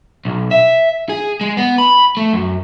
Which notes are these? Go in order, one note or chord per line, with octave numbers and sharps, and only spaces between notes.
B1
E5
G#4
G#3
B3
B5
A3
F#2